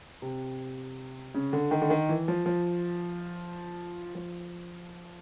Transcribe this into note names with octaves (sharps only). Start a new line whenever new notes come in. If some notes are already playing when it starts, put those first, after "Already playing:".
C3
C#3
D3
D#3
D3
D#3
E3
F3
F3
F3